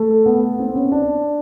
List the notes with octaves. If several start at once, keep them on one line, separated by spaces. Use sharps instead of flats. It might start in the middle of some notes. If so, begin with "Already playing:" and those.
Already playing: A3
B3
C4
C#4
D4